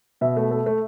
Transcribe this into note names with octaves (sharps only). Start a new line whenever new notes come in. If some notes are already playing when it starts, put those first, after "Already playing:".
B2 E5
A3
A3
A3